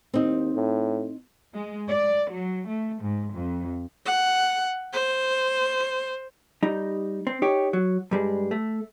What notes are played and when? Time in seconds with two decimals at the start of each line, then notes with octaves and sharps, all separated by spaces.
0.14 D#2 C4 D#4
0.55 A2
1.54 G#3
1.89 D5
2.31 F#3
2.68 A3
3.01 G#2
3.33 F2
4.06 F#5
4.93 C5
6.63 G3 D#4
7.27 C4
7.42 D#4 G4 C#5
7.73 F#3
8.11 G2 G3 G#3
8.51 A3